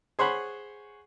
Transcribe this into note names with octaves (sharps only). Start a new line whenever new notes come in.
G#4 C5 C#5 F#5 B5